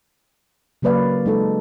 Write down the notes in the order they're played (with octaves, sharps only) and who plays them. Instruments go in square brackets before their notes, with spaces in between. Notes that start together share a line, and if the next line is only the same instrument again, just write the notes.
[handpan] C#3 F#3 A#3 B4 D5 F5
G#3 D#4 A4